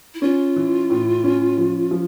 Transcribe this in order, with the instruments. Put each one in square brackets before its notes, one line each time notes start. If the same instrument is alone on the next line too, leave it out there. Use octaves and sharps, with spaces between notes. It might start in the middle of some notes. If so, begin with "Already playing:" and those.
[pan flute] E4
[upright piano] C#4 [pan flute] F4
[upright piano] E3
A2
C#4
F3
F3